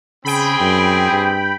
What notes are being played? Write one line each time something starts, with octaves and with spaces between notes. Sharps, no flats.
C#3 C4 G#4 G5 B5
F#2
G2